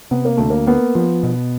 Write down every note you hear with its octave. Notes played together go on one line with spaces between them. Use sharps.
C3 B3
A#3
D2 A3
A#3
A#3 B3
F3
B2